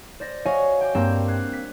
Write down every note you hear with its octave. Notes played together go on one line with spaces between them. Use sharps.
C5 D5 A#6
F#4 C#5 D#5 F5 G#5 C#6
G5 G#5 D6
G2 A#3 C4
F#6 G#6 C7
B6